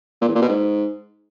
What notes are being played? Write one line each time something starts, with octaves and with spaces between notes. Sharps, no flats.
A#2
E2
A#2
B2
G#2